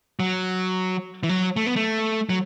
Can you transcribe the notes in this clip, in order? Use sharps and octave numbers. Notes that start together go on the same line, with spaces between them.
F#3
E3
F#3
A3
B3
A3
F#3